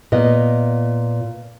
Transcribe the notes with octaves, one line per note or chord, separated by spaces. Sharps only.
A#2 B3 D#5